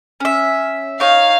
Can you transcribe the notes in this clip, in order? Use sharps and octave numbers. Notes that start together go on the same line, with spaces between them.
C#4 E5
D#4 C#5 F5